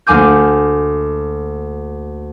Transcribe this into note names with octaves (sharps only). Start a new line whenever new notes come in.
D2 A#3 G#5 D6 G6